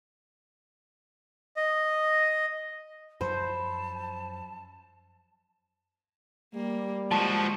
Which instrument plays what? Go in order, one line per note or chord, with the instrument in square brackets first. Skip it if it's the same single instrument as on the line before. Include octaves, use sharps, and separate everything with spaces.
[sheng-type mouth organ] D#5
[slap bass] F#2 F3 F#3 [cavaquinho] E4 F#4 B4 [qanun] C5 [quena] A5
[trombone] G3 [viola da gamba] A#3
[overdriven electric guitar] F3 F#4 [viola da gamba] G#3 [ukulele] A5